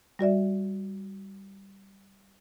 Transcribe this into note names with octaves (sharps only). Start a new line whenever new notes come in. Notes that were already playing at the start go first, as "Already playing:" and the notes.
G3 F#4 D5 E5